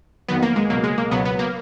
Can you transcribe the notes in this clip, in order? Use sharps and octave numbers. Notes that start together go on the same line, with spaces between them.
F2 D#3 F#3 B3
A#3
G#3
C#2 B2 F#3 A#3
G#3
A#3
C#2 B2 F#3 B3
B3
A#3